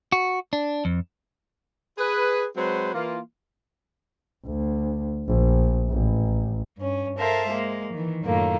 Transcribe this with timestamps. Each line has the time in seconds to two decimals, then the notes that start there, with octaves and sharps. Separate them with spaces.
0.12 F#4
0.53 D4
0.85 F2
1.98 G#4 B4
2.56 F#3 G#3 C4 F#4 B4 C5
2.94 E3 A#3 F4
4.46 D2
5.26 A#1
5.89 A1
6.78 G2 C#4
7.18 A4 A#4 C5 E5 F5
7.49 G#3 A#3
7.94 D#3 E3
8.25 F#2 A2 D#3 A3 A#3 F4